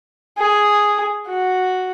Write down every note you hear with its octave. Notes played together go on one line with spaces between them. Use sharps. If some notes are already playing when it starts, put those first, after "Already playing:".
G#4
F#4